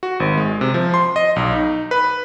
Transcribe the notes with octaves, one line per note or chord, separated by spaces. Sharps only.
F#4
G#1
G#3
C3
F3
C6
D#5
B1
D#4
B4